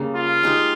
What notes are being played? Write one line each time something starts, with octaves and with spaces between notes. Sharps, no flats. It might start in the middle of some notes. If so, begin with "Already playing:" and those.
Already playing: C#3 G3 A#3 C#4
F4
G#3 D#4 G4